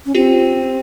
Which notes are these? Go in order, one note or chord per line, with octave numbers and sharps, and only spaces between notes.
C#4
C4 F4 G4